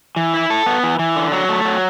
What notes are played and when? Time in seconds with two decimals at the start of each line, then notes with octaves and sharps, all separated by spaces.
0.16 E3
0.34 E4
0.50 A4
0.66 B3
0.83 E3
0.99 E3
1.16 D3
1.32 F#3
1.49 A3
1.65 F#3